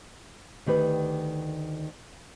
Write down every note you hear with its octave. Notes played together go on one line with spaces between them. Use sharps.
D2 D#3 G4 B4